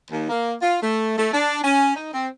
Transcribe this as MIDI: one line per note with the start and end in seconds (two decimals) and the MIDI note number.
0.10 0.29 39
0.29 0.54 58
0.62 0.77 65
0.82 1.16 57
1.18 1.32 57
1.33 1.59 62
1.64 1.94 61
1.96 2.10 63
2.12 2.28 60